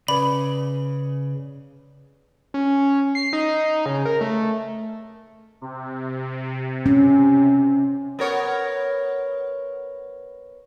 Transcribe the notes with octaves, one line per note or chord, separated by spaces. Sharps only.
C#3 B4 D5 B5
C#4
C7
D#4
C#3
A#4
A3
C3
C#4
B3 A#4 C#5